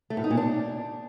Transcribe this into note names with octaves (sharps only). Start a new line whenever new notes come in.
A3
A2
D#4
A#2
D4